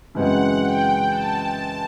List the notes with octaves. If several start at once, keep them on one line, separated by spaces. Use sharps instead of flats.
F#2 C#3 E3 G#3 C4 F#5
G5
A5